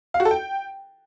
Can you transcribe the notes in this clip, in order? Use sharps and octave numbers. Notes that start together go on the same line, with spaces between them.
F5
F#4
A4
G5